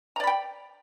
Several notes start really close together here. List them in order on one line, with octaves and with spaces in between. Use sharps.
A#5 D5 B5 G5